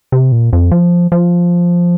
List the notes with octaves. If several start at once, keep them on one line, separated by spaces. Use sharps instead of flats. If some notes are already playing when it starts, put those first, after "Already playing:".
C3
A#2
F2
F3
F3